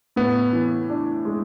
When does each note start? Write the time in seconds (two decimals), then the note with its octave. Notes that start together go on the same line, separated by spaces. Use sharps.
0.16 A2 B3
0.53 E3
0.89 D4
1.25 G#3